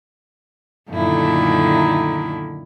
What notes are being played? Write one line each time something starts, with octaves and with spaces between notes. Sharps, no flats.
F#2 A#2 D3 D#3 A3 E4